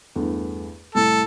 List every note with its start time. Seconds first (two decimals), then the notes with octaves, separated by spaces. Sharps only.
0.16 E2 G2 A3
0.95 C2 A2 E4 A4